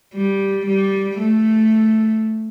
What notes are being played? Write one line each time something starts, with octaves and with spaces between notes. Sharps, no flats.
G3
G3
A3